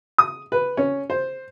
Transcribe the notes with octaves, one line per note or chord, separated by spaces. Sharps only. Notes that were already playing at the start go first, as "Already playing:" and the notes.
D#6
B4
C#4
C5